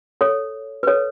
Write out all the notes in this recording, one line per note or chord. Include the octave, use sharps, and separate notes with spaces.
A4 C#5
B4
A4 C#5